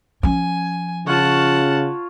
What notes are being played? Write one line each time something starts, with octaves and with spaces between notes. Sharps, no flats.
F3 C#4 G#5
C#3 F4 C#5 F#5 A5